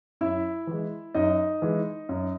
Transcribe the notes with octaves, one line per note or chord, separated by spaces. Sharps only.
F#2 E4 E5
E3 G#3
F#2 D#4 D#5
E3 G#3
F#2